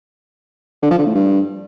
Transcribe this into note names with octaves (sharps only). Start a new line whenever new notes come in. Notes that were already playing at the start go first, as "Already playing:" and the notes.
D3
F3
D3
A2
G2